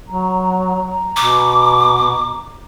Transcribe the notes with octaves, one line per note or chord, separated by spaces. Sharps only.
F#3 A#5
B2 D6